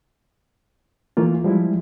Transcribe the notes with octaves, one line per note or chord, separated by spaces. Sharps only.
E3 A3 A#3 F4
F3 G3 G#3 E4